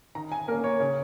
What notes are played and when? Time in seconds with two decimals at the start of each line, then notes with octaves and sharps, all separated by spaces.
0.15 D#3 A#5
0.32 G#5
0.48 A#3 A#4
0.51 C#4
0.64 C#5
0.80 C#3